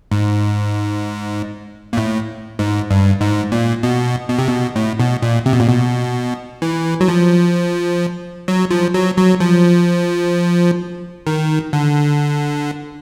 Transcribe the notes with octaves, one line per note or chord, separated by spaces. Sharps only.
G#2
A#2
A2
G#2
G2
G#2
A#2
B2
B2
C3
B2
A2
B2
A#2
C3
B2
A#2
B2
E3
F#3
F3
F#3
F3
F#3
F#3
F3
D#3
D3